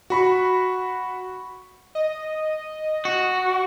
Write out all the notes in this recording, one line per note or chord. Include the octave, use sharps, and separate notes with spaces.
F#4 B5 C#6
D#5
F#4